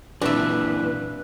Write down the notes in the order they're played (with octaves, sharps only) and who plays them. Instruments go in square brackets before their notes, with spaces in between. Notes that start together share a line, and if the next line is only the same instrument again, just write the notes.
[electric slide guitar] A#2 E3 C4 [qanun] D4 E5 [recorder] B4